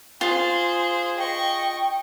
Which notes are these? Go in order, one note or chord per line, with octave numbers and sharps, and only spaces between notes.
F4 G#4 C5
D#5 G5 C#6